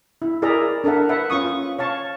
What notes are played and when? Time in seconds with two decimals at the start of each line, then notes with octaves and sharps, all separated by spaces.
0.22 E4
0.42 E4 G#4 A#4 D5 E5 A#5
0.84 D4 A4 A#4 E5 F#5
1.09 B4 E5 F#5
1.30 C#4 F4 C#6 D#6
1.79 C#5 F5 A5 C#6